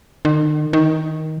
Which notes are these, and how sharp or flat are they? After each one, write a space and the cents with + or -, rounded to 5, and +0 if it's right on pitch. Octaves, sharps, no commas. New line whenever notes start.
D#3 -40
D#3 +15